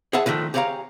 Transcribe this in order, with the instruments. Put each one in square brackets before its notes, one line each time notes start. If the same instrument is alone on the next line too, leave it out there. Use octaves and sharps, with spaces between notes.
[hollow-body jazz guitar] G#4 C#5 E5 F#5 A5
D3 D#3 F3 A3 D4
G4 G#4 C#5 D5 F5 A#5